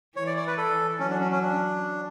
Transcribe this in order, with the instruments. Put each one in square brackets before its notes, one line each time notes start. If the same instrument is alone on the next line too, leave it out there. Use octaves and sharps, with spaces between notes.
[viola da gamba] E3 [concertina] C#5
[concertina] D5
D5
B4
A4
[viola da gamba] F#3 [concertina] C#4
[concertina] D4
C#4
C#4
D4